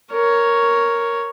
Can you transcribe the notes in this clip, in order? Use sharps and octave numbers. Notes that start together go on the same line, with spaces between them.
A#4 C#5